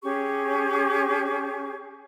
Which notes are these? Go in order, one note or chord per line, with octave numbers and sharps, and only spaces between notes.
C#4 G4 G#4 C#6